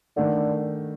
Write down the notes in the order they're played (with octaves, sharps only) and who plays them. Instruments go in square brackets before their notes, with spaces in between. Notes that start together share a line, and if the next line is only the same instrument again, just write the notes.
[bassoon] D3 [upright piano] D#3 A3 D4